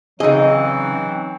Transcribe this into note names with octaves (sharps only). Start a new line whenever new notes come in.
C#3 E3 F#3 C4 D#4 G#4 D#5